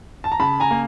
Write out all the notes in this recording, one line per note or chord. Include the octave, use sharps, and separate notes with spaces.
A5
A#5
C#3 A5 B5
G#5 A#5
A#3